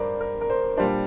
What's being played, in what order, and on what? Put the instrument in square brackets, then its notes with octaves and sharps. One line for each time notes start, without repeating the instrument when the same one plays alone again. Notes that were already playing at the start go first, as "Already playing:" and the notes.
Already playing: [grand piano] G2 [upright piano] A#4 C5 D5
[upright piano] A#4
A#4
C5
[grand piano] A#2 G3 D4 [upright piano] C5